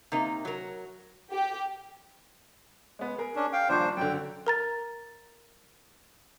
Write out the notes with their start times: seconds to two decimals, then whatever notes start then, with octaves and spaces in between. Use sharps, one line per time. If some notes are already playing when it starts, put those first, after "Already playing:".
0.12 C3 A#3 D#4
0.45 F#3 A#4
1.32 G4
2.99 G#3 B3
3.18 G#4 A#4
3.36 C#4 D4
3.53 F5 G5
3.69 D#1 A#1 D4 C5 C#6
3.97 F#2 D3 G5
4.47 A#4 A#5 A6